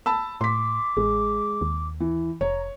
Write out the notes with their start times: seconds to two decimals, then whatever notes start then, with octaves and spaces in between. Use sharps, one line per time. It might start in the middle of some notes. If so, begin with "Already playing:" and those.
0.06 A5 B5 E6
0.41 A2 C6 D6 B6
0.97 A1 G#3
1.61 D#2
2.00 E3
2.41 F1 C#5 A#5